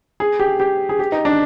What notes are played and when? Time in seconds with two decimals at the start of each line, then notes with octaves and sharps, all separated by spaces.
0.20 G#4
0.40 G4
0.60 G4
0.89 G#4
0.99 G4
1.12 D#4
1.25 D4